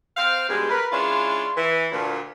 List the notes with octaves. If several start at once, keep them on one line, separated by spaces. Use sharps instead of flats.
C4 C5 F5
G2 B2 G3 G#3
A#4 B4
G#3 C#4 D4 E4 F4
E3
D2 A#2